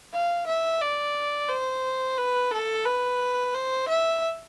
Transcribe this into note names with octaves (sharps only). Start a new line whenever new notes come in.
F5
E5
D5
C5
B4
A4
B4
C5
E5